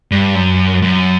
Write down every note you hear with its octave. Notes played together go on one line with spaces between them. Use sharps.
G2
F#2
F#2